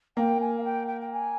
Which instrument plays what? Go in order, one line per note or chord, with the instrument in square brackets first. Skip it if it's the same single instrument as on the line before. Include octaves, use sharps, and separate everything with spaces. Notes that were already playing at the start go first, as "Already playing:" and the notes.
[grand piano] A#3 [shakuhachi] G5
[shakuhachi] G#5
F5
G5
G5
G5
G#5